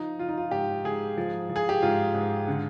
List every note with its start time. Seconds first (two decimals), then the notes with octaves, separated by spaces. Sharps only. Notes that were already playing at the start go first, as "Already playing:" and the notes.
Already playing: F3 D#4
0.19 F3 F4
0.29 D#4
0.38 F4
0.51 G#2 G4
0.85 G#2 G#4
1.18 F3
1.49 F3
1.56 G#4
1.69 G4
1.82 G#2 F4
2.14 G#2
2.48 D3